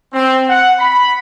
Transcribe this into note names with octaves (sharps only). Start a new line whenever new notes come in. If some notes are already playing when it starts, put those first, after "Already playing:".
C4
F#5
B5